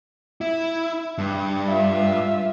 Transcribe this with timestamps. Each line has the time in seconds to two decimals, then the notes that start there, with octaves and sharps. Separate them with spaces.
0.41 E4
1.18 G2
1.70 F4 E5